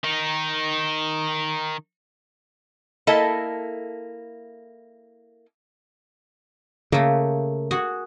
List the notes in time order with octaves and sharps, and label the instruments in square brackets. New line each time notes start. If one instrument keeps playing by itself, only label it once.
[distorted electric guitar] D#3 D#4
[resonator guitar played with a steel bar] A#3 E4 A4 D#5 E5 A5
[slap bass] C#3 [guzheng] A3 A#3
[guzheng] F#4 G#4 F#5